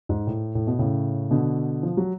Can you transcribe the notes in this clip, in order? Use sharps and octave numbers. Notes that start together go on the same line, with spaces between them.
G#2
A2
A2
B2
A2 C#3
B2 D3
F3
F#3